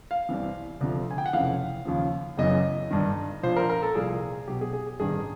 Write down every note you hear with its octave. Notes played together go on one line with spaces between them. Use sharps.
F5
C2 C3 E3
D2 C3 F3
G#5
G5
F#5
F1 F2 C#3 E3 F5
D#2 C#3 F3
F#1 F#2 C#3 E3 D#5
G1 G2 D#3
A#1 A#2 F3 C5
A#4
A#4
A4
C2 A#2 F3 G#4
B1 B2 G4
G#4
G#4
A1 G2 D#3 G#4